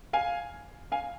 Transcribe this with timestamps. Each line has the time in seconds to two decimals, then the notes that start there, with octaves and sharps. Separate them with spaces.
0.13 F5 G#5
0.92 F5 G#5